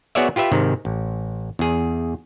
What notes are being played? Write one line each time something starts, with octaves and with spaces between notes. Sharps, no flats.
B3 F#4 G#4 C#5 D5 E5
F4 G4 B4 E5
G#2 C3 D#3
A1
E2 G#4